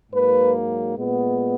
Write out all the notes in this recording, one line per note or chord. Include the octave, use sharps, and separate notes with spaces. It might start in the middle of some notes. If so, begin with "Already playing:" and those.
G#2 F#3 A#3 B4
A#2 G#3 B3